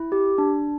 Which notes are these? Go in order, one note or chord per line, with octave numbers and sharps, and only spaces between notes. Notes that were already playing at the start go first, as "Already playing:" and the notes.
Already playing: E4
G4
D4